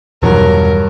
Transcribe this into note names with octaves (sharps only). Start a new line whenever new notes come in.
E2 G2 B2 D#3 F#3 A#4